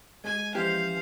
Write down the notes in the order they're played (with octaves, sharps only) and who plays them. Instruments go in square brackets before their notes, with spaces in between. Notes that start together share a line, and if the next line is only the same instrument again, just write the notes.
[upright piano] G#3 [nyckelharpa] G#5
[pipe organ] E3 F3 C#4 [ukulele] E4 G4 [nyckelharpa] C5 F5